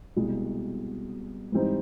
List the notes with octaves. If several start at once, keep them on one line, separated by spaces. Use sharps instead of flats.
C2 B2 G#3
G#2 E3 G3 C4 D#4